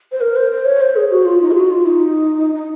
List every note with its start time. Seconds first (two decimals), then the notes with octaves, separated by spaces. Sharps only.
0.12 C5
0.21 A#4
0.36 C5
0.51 C5
0.65 C#5
0.81 C5
0.96 G#4
1.11 F#4
1.25 F4
1.41 D#4
1.51 G#4
1.55 F#4
1.70 F4
1.86 D#4
2.55 D#4